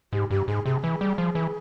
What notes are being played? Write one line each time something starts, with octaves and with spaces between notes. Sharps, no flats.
G#2 G4
G2 G4
G#2 G#4
C3 G#4
E3
G3
F3
E3